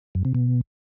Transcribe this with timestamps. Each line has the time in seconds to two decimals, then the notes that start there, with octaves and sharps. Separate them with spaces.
0.15 F#2
0.25 C3
0.35 B2